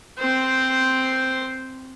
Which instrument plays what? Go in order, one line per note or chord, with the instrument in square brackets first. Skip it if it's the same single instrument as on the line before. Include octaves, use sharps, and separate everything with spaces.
[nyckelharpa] C4 C5